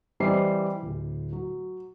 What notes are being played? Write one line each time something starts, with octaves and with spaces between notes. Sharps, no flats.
E3 G3 C4 C5 D#5 C7
D1
F#3